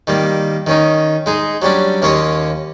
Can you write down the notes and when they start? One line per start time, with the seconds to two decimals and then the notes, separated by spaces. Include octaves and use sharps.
0.07 D#3 G3 A#3
0.67 D#3 C#4 D#4
1.26 G#3 D#4 G#4
1.62 F#3 G3 C#4 D4
2.02 D#2 A#3 C#4 C#5 D#5 C6